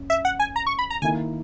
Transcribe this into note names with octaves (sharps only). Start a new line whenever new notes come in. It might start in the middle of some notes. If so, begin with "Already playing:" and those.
Already playing: F#2
E5
F#5
G#5
A#5
C#6
B5
A#5
D#3 A#3 E4 G#5